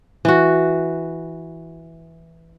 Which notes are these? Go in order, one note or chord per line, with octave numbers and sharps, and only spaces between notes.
E3 F#4